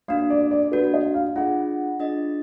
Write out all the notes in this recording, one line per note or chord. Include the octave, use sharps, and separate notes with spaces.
A#3 D4 F#4 F5
D5
D5
A#3 D4 F#4 B4
D#5
F5
D4 F4 G#4 D#5 F#5
D4 F4 G#4 D#5